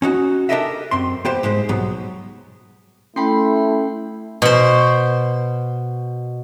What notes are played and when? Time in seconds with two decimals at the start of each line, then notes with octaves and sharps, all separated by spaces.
0.02 C#4 D#4 F#4
0.49 D4 G4 A4 A#4 D#5 E5
0.91 F#2 C4 C6
1.25 B3 G4 C5
1.43 G#2 G#3 G4 C5
1.69 B1 G#2 F#3 B3
3.16 A3 C#4 E4 G5 B5 C6
4.42 B2 C5